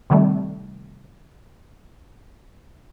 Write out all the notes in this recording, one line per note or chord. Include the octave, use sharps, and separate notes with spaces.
C3 D#3 G3 A3